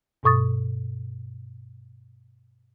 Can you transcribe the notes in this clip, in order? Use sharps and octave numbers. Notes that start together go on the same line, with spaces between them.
G2 B2 A4 C#6 D#6 A6